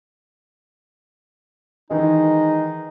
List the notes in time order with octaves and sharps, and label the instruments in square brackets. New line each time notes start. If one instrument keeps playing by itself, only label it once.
[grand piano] D#3 E3 [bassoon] G#3 [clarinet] D#4